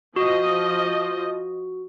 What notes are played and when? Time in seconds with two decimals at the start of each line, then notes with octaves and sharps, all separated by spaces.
0.16 F3 F#4 D#5